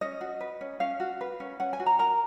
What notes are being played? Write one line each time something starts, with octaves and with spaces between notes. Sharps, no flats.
C#4 D#5
F#4
B4
C#4
C#4 F5
F#4
B4
C#4
C#4 F#5
G#5
F#4
A#5
A#4 A#5